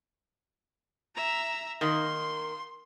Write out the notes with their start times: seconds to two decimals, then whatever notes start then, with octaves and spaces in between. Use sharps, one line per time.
1.15 E5 A#5
1.81 D#3 A#3 C6